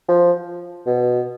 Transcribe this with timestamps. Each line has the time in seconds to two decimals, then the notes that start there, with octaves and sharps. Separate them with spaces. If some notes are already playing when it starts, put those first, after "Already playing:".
0.09 F3
0.86 B2